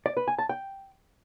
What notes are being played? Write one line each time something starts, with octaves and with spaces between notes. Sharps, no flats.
D5
B4
G#5
A5
G5